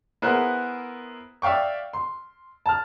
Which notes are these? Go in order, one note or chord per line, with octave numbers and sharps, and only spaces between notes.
B3 E4 G#4 A#4 C5 F#6
D5 E5 F5 G5 C#6
C6
A5 F6